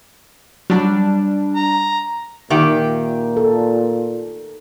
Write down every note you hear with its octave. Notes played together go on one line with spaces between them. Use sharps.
F#3 G3 D4
A#5
A#2 D#3 G4 E5
A4